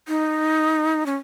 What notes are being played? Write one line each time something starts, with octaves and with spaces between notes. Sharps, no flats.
D#4
C#4